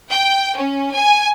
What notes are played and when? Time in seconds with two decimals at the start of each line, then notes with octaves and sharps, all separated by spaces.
0.10 G5
0.56 C#4
0.94 G#5